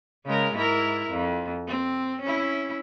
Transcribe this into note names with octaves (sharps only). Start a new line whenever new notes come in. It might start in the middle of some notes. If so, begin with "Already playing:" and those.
C#3 G#3 A#4
G#2 E4 A#4
F2
C4
C#4 E4